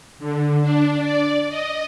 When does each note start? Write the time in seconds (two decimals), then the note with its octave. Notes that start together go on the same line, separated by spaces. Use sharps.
0.19 D3
0.62 D4
1.01 D5
1.49 D#5